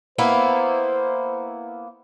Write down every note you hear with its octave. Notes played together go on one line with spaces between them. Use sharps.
A#3 B3 E4 C5